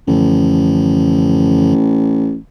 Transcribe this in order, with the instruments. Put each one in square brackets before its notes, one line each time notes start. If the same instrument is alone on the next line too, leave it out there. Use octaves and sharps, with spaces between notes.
[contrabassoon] A1 [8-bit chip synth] F#2 D3 F3